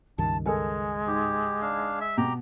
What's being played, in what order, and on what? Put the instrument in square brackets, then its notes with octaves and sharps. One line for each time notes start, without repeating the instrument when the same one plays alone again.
[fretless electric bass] C#2 G2 D#3 [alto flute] A5
[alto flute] G#3 [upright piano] A4 A#4 G#5
[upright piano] G#2 [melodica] G4
[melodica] D4 F5
E5
[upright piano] B2 [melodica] G4 G5 A#5